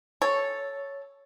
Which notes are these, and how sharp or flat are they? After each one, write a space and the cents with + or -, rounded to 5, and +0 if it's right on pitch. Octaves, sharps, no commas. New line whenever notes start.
A4 +0 C#5 +0